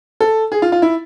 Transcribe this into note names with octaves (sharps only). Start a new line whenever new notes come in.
A4
G#4
F4
F4
E4